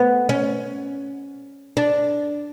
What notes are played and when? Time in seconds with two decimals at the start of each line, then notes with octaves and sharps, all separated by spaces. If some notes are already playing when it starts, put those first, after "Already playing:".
Already playing: B3
0.29 C#4
1.77 D4